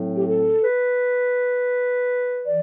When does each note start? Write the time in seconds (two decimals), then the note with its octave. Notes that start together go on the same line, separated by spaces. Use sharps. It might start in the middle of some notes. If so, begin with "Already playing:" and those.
Already playing: A2 F#3 C4
0.16 G4
0.27 A4
0.63 B4
2.46 E3 D5